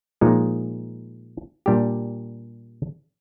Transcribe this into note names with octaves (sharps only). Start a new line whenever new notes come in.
A#2 F3 G#3 D#4
A#2 G3 D4 G4